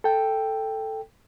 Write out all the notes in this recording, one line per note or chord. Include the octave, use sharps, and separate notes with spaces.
A4 G5